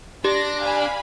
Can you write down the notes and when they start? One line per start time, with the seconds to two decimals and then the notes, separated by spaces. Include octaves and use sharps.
0.24 D4 G4 A#6
0.60 F5 G#5 B5